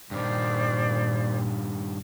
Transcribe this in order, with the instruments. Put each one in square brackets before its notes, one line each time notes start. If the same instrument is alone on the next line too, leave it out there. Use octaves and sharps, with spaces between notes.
[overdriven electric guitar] G2 D#3 [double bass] A#2 [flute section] C5 D5 D6